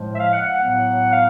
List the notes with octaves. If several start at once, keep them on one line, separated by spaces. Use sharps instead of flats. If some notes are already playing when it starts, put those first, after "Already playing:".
Already playing: A2 F3 G#3
E5
F5
F#5
F#5
A2 F#3 B3
F5